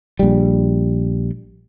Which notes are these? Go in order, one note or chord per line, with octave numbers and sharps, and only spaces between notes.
A#1 G3